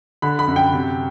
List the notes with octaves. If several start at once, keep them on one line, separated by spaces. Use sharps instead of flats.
D3 B5
B5
F#2
G5
C3